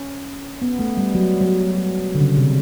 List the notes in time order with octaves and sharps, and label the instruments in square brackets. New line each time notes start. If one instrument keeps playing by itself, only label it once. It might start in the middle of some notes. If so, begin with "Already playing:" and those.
Already playing: [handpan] C#4
B3
A3
G3
F#3
F#3
D3
C#3
C3